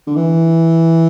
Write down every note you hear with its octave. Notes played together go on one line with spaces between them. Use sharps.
D3
E3